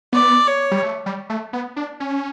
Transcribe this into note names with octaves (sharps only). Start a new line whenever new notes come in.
B3 D5
C#5
G3
A3
G3
A3
B3
D4
C#4